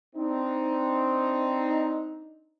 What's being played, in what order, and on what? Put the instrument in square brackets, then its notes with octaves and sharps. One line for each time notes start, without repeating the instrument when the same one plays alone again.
[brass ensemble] C4 D4 D#4